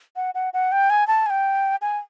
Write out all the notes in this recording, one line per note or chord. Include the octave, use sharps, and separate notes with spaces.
F#5
F#5
F#5
G5
G#5
A5
G#5
G5
G#5